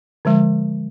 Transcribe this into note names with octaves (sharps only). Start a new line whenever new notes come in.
D3 F3 G#3